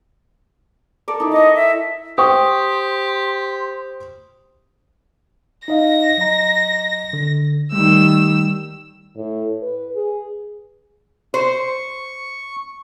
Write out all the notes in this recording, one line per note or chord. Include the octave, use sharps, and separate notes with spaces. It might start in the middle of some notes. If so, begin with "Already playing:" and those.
A4 A#4 D5
D#4 E4
D#5 C#6 D6
E5
G4 C5 G5 C6 C#6 D#6
D#4 D#5 F5 A#6
F#3 D#5 A#5
D3
D#3 G3 A3 E6
A2
B4
G#4
C5 C#6